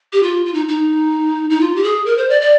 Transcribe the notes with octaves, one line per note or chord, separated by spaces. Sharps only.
G4
F4
F4
D#4
D#4
D#4
F4
G4
G#4
A#4
C5
D5
D5